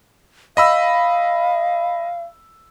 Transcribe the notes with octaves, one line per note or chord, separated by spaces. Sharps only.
D#5 F5 B5 E6